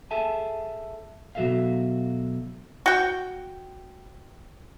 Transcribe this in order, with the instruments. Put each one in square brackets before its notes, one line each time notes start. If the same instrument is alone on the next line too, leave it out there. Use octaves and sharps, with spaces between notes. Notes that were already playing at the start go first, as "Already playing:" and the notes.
[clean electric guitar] G#4 A4 E5 G#5 A5
B2 F#3 F#4 A4 E5 F5
[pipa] F#4 G5